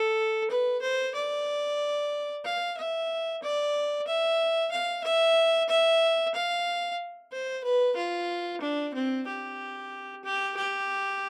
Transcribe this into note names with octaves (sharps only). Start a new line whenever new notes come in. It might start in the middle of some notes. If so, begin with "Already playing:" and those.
Already playing: A4
B4
C5
D5
F5
E5
D5
E5
F5
E5
E5
F5
C5
B4
F4
D4
C4
G4
G4
G4